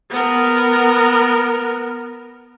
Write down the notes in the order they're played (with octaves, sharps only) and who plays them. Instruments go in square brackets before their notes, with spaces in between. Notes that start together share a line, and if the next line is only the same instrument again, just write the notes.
[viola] B3 A#4